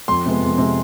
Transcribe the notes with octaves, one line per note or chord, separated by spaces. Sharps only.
F2 C6
C3 G#3 B3
F2
C3 G#3 B3